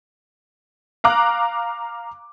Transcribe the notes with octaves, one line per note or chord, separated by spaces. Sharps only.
F5 A#5 D6 F#6